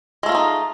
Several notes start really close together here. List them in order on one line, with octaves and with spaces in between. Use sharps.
G#3 A3 F4 C#4 D#4